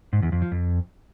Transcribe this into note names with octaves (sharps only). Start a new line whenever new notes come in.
G#2
E2
F2
F3
F2